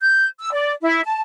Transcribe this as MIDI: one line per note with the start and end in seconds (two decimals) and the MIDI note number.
0.02 0.26 91
0.40 0.52 88
0.52 0.72 74
0.82 1.00 64
1.04 1.21 81